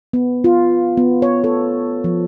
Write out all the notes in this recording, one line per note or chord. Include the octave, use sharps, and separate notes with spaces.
B3
F4
B3
C#5
A4
F3